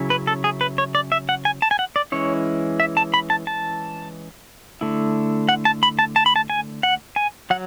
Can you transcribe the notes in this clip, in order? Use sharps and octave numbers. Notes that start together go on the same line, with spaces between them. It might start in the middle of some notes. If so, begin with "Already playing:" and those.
Already playing: C#3 F#3 C#4 E4
B4
A4
G#4
B4
C#5
D5
E5
F#5
G#5
A5
G#5
F#5
D5
E3 G#3 C#4 E4 C#5
E5
A5
B5
A5
A5
D3 A3 E4
F#5
A5
B5
A5
A5
B5
A5
G#5
F#5
G#5
F#3 F#5